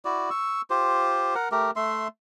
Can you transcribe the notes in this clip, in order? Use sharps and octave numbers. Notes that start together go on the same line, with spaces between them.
E4 F#4 D5
C#6 E6
F4 G4 C5
A#4 F#5
A3 G4 A#4
A3 E5 C6